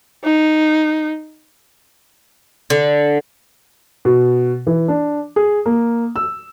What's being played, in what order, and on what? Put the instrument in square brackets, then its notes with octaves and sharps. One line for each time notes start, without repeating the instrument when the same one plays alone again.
[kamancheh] D#4
[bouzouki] D3
[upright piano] B2
E3
D4
G#4
A#3
E6